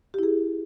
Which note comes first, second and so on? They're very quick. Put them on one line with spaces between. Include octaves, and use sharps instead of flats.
G4 E4 G#4